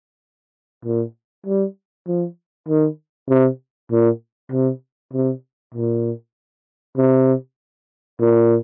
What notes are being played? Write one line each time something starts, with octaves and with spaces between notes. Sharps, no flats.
A#2
G3
F3
D#3
C3
A#2
C3
C3
A#2
C3
A#2